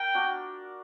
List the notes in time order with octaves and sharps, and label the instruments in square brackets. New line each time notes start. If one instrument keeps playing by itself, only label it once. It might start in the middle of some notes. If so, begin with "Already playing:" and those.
Already playing: [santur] A#4 [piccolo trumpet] G5
[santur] D4 F#4